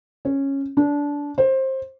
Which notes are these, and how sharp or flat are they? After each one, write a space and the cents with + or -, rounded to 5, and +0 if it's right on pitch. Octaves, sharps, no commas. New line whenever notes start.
C#4 -10
D4 -20
C5 +20